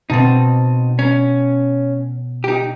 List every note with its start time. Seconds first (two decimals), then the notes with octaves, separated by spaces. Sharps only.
0.10 B2 C4 D#4 A5 A6
0.99 C#4
2.44 D#4 G4